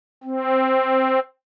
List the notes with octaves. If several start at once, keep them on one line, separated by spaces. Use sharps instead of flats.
C4